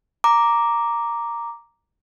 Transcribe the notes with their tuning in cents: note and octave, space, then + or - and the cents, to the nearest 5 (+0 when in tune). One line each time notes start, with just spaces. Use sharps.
A#5 +0 D6 +0